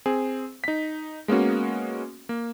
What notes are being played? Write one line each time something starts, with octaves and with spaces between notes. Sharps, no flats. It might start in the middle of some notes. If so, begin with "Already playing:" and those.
C4 G#4
D#4 B6
G#3 A#3 B3 C#4 F#4
A#3